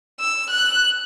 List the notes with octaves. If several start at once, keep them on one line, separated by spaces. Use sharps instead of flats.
E6
F#6